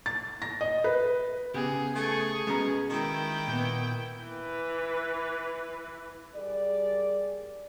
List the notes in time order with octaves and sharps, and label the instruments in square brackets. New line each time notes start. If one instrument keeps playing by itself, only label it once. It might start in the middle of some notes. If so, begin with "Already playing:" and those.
[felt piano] A6
A#6
D#5
B4
[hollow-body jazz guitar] C#3 B3 G4 [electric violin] G#4
[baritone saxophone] A3 [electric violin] G#4 C#6
[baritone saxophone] B2 [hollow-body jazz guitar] G#3 C#4 A#5
[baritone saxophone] D#3 [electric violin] E4 G5
[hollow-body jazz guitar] A#2 B3
[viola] E3 B4
[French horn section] G3 G#4 A#4 D5